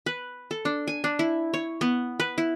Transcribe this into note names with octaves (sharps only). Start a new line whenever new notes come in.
B4
A4
D4
G#5
D4
E4
C#5
B3
B4
E4